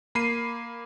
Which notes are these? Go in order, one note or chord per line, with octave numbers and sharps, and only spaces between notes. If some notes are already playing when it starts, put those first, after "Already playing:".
A#3 B5 C7 D#7